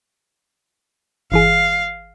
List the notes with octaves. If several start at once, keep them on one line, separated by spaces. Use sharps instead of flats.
G1 E3 G#4 F5